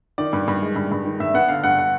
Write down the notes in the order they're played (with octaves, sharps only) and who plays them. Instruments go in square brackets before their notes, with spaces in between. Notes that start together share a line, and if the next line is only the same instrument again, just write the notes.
[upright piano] D#3 [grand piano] D5
[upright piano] G2
G2
G#3
G2
G2
D#3
[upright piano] G2 [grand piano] E5
[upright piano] B3 [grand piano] F#5
[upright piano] D3 [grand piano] F5
[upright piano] G2 [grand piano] F#5
[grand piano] F#5